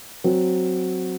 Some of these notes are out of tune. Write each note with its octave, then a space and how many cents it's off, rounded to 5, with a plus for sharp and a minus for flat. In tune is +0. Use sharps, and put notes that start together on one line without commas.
F#3 +0 C4 +0